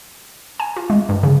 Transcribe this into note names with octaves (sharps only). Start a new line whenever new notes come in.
G#5
F4
G#3
G2
C#3